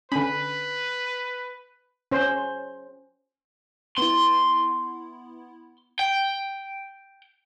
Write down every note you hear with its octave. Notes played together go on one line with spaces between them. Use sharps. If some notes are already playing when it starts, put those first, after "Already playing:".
D3 C#4 B4 G#5 B5
C#4 C5
B3 E4 C6
G5